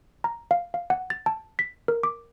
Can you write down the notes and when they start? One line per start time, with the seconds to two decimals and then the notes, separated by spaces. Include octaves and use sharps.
0.24 A#5
0.51 F5
0.74 F5
0.90 F#5
1.10 A6
1.26 A5
1.59 B6
1.88 A#4
2.03 D6